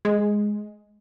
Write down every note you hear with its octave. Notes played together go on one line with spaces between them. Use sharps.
G#3